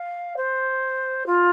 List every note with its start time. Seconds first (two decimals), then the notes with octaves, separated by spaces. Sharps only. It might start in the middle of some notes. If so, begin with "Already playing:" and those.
Already playing: F5
0.36 C5
1.26 F4